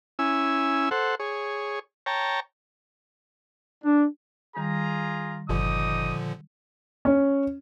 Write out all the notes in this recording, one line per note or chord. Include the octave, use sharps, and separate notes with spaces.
C#4 E4 G#5 E6
A4 C5 F#5
G#4 C#5
C#5 G5 A5 A#5
D4
D#3 G3 F4 G#4 A#5
G1 A#2 D3 F3 D#4 D6 D#6
C#4